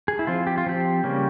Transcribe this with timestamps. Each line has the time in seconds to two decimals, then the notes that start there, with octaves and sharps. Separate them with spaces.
0.08 G#4
0.19 E4
0.27 F3 C4 F4
0.47 G4
0.58 F4
0.66 F3 C4 G4
1.03 C#3 G3 A#3 C#4